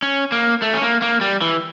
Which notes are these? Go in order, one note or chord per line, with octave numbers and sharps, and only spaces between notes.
C#4
A#3
A3
C#4
A#3
A#3
G3
E3